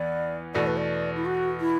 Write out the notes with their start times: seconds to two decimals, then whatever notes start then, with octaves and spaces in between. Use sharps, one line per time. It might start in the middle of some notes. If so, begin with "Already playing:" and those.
Already playing: E2 E3 B3 D5
0.54 E2 B2 A3 D5
0.67 B4
0.77 D5
1.16 E4
1.25 F#4
1.60 E4